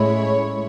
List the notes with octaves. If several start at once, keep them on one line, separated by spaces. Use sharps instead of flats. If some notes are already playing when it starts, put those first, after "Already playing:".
Already playing: A2 G#3 C#4 E4 C#5